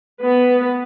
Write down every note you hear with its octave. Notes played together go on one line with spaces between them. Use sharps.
B3 B4